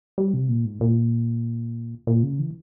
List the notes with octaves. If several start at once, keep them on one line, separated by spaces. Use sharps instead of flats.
G3
C3
A#2
G#2
A#2
A#2
C#3
E3